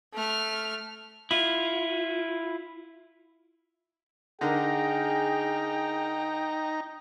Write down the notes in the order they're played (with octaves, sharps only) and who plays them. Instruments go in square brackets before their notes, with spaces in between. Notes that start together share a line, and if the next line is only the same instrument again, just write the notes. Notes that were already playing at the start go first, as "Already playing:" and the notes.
[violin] A3 F6
[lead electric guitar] E4 F4
[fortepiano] D3 A#4 [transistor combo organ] D#4 A#5 [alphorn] G#4 [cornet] G5